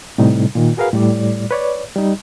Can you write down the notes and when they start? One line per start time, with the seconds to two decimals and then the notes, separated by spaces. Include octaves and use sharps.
0.18 A2 C3 G3 D#4
0.55 A#2 D#3
0.77 F#4 G#4 A#4 B4 F5
0.93 A2 G3 D5
1.51 B4 C#5 D5
1.96 G3 D#4